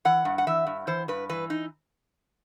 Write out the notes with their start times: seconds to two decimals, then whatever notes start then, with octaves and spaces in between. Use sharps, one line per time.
0.05 E3 F#5
0.25 G2
0.38 F#5
0.47 E3 E5
0.67 G2
0.87 E3 C5
1.08 G2 B4
1.29 E3 B4
1.50 D#4